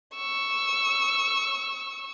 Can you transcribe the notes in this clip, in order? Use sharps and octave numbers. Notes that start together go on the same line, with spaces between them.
C#6 E6